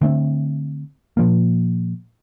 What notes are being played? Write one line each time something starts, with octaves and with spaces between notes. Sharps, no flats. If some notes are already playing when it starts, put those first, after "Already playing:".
D3 A3 B3 C4
A#2 F3 A#3